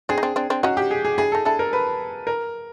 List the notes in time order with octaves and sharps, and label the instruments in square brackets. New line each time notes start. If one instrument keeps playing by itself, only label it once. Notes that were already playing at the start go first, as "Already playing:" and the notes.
[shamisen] C4 D4 [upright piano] G#4
[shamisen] D#4
C4 D4
C4 D4
C4 D4
[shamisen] C#4 D#4 [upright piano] F#4
[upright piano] G4
G#4
G#4
[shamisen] D4 E4 [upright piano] G#4
[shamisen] D#4 [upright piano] A4
[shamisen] D4 E4 [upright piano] A4
[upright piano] A#4
B4
A#4